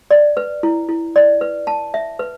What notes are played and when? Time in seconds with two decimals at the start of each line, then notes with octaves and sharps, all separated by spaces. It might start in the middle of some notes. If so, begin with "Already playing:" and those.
0.11 D5
0.37 B4
0.63 E4
0.89 E4
1.16 D5
1.41 B4
1.67 A5
1.94 E5
2.19 B4